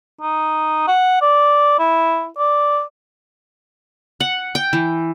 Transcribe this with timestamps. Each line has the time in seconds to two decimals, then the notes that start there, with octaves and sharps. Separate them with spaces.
0.21 D#4
0.88 F#5
1.22 D5
1.79 E4
2.38 D5
4.20 F#5
4.55 G5
4.73 E3